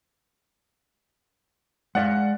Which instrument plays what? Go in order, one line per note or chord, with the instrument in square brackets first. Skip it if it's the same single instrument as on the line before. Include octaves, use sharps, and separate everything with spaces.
[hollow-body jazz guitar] G#3 D5 F5 [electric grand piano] F#5